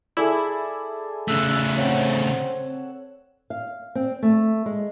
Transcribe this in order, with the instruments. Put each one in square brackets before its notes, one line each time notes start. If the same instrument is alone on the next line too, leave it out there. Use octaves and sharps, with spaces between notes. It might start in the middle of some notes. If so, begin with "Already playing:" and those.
[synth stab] E4 [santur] G#4 A4 D5
[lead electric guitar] C#3 A3 [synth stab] E6 F#6
[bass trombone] C4 [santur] C#5 F#5 G5
[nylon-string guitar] F5
C4
A3
G#3